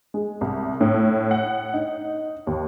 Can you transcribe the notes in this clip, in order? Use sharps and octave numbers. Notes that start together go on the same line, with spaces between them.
G#3
C2
A2
F#5
D#4
D#2